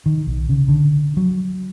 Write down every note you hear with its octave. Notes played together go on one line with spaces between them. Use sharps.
D#3
B1
C#3
D3
F#3